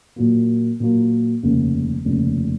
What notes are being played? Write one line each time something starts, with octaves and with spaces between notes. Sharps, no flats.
A#2 F#3 A#3
A#2 F#3 A#3
F1 D#2 C#3
F1 D#2 C#3